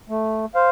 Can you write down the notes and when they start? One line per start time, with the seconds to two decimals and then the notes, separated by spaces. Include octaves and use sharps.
0.09 A3
0.55 C5 F5